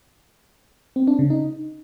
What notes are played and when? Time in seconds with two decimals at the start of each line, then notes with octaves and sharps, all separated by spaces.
0.96 C4
1.07 D4
1.19 C#3
1.30 D#4